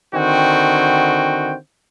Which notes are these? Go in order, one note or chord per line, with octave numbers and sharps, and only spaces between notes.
D3 D#3 C4 F#4 G5